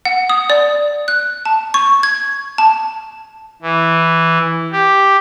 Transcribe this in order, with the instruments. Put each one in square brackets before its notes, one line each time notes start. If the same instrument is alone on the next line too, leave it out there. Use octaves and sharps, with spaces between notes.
[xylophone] F#5
D#6
D5
F#6
A5
C#6
G#6
A5
[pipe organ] E3
G4